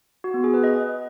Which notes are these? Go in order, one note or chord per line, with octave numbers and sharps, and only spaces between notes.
F#4
B3
G#4
B4
D#5